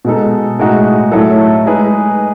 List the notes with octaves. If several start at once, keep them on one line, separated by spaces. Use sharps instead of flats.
B2 G#3 D#4 A4
A2 G#3 D#4 F#4
A2 F#3 A3 E4 A4
G#3 D#4 G#4 B4